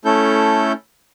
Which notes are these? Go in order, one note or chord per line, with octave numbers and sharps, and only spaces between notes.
A3 C#4 E4 A4 G6